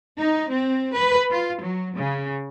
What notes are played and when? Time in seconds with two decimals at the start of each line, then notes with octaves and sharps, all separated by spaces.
0.17 D#4
0.50 C4
0.94 B4
1.30 F4
1.61 F#3
1.93 C#3